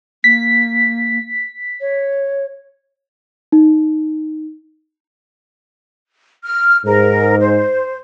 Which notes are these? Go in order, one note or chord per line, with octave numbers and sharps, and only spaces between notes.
A#3 B6
C#5
D#4
F6
G#2 A#4
C5